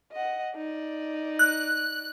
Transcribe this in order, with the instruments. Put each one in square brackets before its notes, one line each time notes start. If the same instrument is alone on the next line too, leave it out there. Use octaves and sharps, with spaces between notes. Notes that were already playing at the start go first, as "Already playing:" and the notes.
[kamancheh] D#5 F#5
D#4 D5
[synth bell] F#6